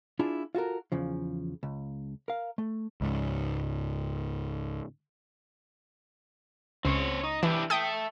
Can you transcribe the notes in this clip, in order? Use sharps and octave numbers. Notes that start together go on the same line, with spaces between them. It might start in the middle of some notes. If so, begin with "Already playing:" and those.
D4 E4 F4 G#4
F4 F#4 A4 A#4
E2 C#3 F3
C#2
A#4 F5
A3
C#2 G#2
C#2 C4 C#5
D#4
E3 D4 E4 G4
A4 E5 G5 D#6